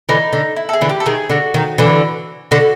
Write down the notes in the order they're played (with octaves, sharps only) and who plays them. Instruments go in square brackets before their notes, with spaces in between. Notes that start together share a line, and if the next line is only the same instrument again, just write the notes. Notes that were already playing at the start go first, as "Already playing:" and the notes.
[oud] D3 E3 [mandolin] D#4
[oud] D3
[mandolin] E4
A4
G#4
[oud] D3 E3
[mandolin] G4
A4
[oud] D#3 [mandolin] G#4
[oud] D3 [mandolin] F#4
[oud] D#3
D3 E3
[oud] D3 [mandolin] F#4